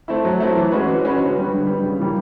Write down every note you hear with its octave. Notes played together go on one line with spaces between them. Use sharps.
A3 C4 E4
F#3
A3 C4 E4
E3
G#3 C#4 F#4 B4
E3
G#3 C#4 F#4 B4
D3
G3 B3
D3
G3 B3
C#3
E3 G3 A#3